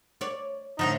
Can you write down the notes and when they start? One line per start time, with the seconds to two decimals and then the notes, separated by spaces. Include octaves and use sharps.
0.21 C#5 D5
0.79 A2 D3 F3 D#4